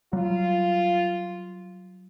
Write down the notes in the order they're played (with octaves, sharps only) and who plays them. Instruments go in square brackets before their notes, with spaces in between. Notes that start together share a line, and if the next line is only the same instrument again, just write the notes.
[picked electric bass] F#3 G3 [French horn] F4